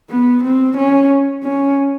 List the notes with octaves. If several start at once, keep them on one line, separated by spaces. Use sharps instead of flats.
B3
C4
C#4
C#4